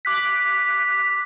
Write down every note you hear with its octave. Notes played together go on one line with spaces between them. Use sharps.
D6 F#6 B6